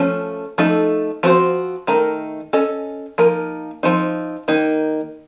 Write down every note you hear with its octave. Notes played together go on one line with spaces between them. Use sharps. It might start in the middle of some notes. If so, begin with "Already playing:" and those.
Already playing: F3 A3 C#4
F3 A3 D#4 A4
F3 C4 F#4 C5
D#3 A3 D#4 A#4
C#4 A4 D#5
F3 A#3 D#4 A#4
F3 C4 D#4
D#3 A#3 D#4